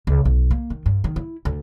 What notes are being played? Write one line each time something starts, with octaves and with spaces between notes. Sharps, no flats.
C#2
B1
A#3
D#3
G2
D#3
E4
D2